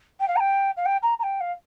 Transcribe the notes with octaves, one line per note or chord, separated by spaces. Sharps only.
G5
F5
A#5
G5
F5
G5
A#5
A#5
G5
F5